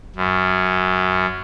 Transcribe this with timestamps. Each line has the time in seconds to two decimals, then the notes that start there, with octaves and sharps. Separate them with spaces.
0.16 F#2